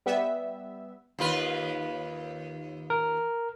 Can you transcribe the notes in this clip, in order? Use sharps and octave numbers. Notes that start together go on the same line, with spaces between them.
G3 B3 E5
D#2 F4 B4
A#4